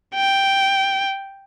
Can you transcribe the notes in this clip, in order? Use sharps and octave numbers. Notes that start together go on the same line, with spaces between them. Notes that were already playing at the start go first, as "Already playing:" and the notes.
G5